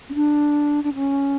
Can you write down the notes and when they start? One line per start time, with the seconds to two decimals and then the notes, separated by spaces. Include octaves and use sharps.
0.10 C#4
0.15 D4
0.84 D4
0.95 C#4